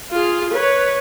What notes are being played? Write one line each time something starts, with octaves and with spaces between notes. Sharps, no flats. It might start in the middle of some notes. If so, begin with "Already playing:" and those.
F4 G#4
B4 C#5